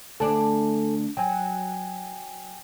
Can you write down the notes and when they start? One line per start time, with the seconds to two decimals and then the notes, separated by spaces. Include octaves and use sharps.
0.20 D2 D4 A4 G#5 A5
1.17 F#3 G5 G#5